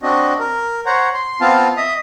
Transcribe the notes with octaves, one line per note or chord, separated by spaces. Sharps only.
C4 D4 F#4 D#5
A#4
C5 C#5 F#5 A#5
C6
B3 C4 F4 F5 A5
D#5 E5 D#6